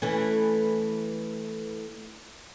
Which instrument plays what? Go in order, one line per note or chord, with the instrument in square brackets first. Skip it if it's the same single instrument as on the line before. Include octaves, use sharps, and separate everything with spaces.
[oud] E3 A3 C#4